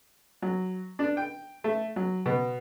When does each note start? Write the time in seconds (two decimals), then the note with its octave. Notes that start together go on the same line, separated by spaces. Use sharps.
0.42 F#3
0.99 D4
1.17 G5
1.64 A3
1.96 F#3
2.26 B2